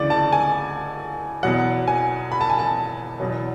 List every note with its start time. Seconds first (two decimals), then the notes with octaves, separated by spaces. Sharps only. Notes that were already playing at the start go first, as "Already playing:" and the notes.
Already playing: D2 C#3 E3 D5
0.10 A5
0.32 G#5
1.43 E2 B2 F#3 F#5
1.88 G#5
2.32 B5
2.41 A5
2.50 G#5
2.59 A5
3.20 E2 B2 F#3